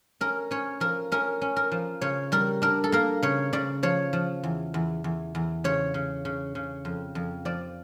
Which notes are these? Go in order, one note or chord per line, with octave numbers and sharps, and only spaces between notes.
C#4 A#4
C#4 C#5
F3 A#4
C#4 A#4
C#4
A#4
F3
C#3 C#5
G3 A#4
D4 A#4
A4
A#3 A#4
C#3 C#5
C#3 D5
F3 C#5
F3
E2
E2
E2
E2
C#3 C#5
C#3
C#3
C#3
F2
F2
F3 D5